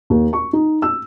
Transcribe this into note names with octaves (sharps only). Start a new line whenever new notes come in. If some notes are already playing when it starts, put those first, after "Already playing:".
D#2
C#6
D#4
E6